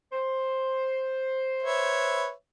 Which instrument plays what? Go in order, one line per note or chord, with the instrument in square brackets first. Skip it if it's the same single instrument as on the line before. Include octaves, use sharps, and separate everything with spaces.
[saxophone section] C5
[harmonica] B4 C#5 E5